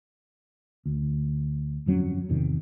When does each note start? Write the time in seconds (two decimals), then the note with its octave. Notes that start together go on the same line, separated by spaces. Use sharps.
0.86 D2
1.86 G1 F2 F#3 C#4
2.29 E2 G#2 C3 D#3